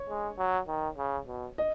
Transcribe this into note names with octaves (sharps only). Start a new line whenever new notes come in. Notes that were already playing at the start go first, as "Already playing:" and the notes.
Already playing: C#5
G#3
F#3
D#3
C#3
B2
D#5